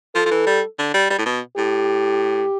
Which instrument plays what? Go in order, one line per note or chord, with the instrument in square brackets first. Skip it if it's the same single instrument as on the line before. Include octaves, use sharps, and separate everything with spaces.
[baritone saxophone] F3 [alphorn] A4
[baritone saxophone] F3
E3
G3
D3
G3
G3
A2
B2
[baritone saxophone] A2 [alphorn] G4